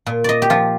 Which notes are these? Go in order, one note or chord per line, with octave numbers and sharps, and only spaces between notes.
A#2
D5 D#5
G4
F3 F4